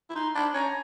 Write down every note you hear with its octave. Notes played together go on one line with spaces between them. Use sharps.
E4
D#4 C6
D4 B5
C#4 A#5